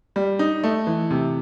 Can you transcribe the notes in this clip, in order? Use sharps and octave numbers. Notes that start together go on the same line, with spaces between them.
G3
D#4
A3
E3
C3